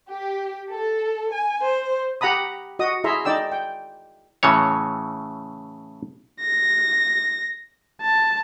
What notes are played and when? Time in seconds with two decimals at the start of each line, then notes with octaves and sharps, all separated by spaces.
0.11 G4
0.69 A4
1.31 G#5
1.65 C5
2.21 G4 F#5 A#5 B5 D#6
2.79 F#4 D#5 D#6
3.04 E4 G#4 E5 A#5 C6
3.25 D#4 D5 G5 E6
3.52 G5
4.43 A2 C#3 E3 C#5
6.41 A#6
8.02 A5